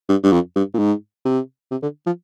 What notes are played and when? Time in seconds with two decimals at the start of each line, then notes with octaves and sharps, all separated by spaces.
0.09 G2
0.23 G2
0.32 F2
0.56 G2
0.74 A#2
0.79 G#2
1.25 C3
1.71 C3
1.82 D3
2.07 F3